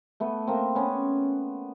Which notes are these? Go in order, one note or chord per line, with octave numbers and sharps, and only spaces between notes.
A3 B3
A#3 C4
B3 C#4